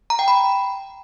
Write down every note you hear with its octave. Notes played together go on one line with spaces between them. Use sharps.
A#5
G5
B5